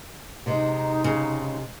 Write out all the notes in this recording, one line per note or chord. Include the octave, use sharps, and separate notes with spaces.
C3 G#3 D#4
C#3